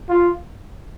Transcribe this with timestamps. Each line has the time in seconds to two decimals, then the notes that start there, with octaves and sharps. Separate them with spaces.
0.09 F4